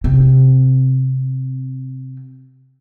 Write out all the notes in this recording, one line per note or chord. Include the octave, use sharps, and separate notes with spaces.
C3 C4